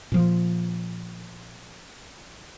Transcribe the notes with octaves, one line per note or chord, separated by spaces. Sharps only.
A#2 F3